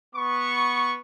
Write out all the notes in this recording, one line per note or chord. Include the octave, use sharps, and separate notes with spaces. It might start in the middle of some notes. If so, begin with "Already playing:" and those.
B3 C#6